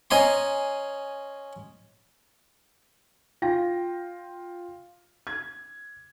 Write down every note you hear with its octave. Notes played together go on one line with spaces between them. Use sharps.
C#4 D#5 G#5 A#5 C6
F4 G5 A#6
G#6